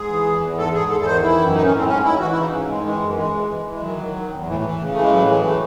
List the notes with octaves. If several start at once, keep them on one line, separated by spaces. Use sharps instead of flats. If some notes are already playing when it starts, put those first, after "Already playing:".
Already playing: G#2 G#4
E3
E2
E2
G#2 A4
G#2 G#4
E2 A4
A4
D#3 C5
E3 E4
F#2
A2 D#4
C#4
A2
C4
G#2 C#4
D#3 E4
E3 F#4
E4
C#3
D#4
G#2
D#3 G#3
E3 G#3
F#2
E3 G#3
E3
E3
E3
G#3
D#3 F#3
D#3
D#3
E2
A2 E3
E3
C#3
E3 A3
G#3
A2 F#3
E3 G#3
A3